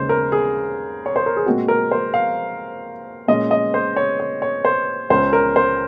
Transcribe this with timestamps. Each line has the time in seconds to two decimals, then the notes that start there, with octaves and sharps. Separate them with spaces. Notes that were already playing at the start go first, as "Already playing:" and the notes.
Already playing: D#2 C#3 G#3 C#4 C5
0.09 A#4
0.32 G#4
1.06 C#5
1.16 C5
1.26 A#4
1.37 G#4
1.46 A#2 G#3 C4 F#4
1.68 A#4
1.91 C5
2.14 F5
3.28 A#2 G#3 C#4 D#5
3.51 D#5
3.74 C5
3.97 C#5
4.20 C#5
4.42 C#5
4.65 C5
5.10 C#2 C#3 G#3 C#4 C5
5.33 A#4
5.56 C5